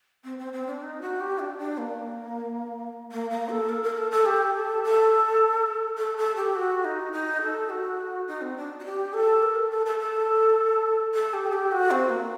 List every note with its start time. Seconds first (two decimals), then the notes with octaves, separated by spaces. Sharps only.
0.24 C4
0.39 C4
0.53 C4
0.67 D4
0.82 D#4
1.01 F#4
1.20 G4
1.39 D4
1.58 D4
1.78 A#3
3.12 A#3
3.30 A#3
3.49 A4
3.69 A#4
3.83 A#4
3.98 A4
4.11 A4
4.25 G4
4.55 A4
4.84 A4
5.98 A4
6.17 A4
6.36 G4
6.55 F#4
6.85 D#4
7.12 D#4
7.42 A4
7.69 F#4
8.28 D#4
8.41 C4
8.57 D4
8.80 F#4
8.85 G4
9.13 A4
9.42 A#4
9.56 A4
9.70 A4
9.85 A4
10.00 A4
11.14 A4
11.33 G4
11.46 A4
11.52 G4
11.72 F#4
11.91 C4
12.09 A#3